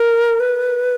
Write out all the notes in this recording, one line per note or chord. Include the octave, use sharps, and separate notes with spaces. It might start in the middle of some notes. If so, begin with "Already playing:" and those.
Already playing: A#4
B4